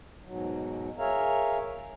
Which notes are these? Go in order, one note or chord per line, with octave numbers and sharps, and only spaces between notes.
G#2 B2 F#3
G#4 A#4 C#5 E5 F5 A#5